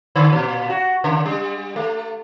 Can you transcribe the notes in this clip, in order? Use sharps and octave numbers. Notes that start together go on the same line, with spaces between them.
D3
A#2
F#4
C#3
G3
A3